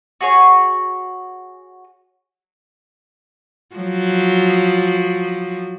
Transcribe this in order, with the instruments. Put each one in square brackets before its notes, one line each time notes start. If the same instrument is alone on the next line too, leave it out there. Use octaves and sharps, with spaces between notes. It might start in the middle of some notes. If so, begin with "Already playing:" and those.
[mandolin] F#4 G#4 C#5
[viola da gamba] F3 F#3